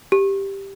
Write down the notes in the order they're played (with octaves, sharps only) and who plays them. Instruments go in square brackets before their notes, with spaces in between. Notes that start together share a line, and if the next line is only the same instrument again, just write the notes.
[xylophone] G4